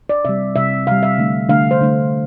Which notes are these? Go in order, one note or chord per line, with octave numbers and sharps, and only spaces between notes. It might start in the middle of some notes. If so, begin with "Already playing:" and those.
D5
C3 G3 E5
C3 G3 E5
C3 G3 F5
E5
D3 A3
D3 A3 F5
C5
D3 A3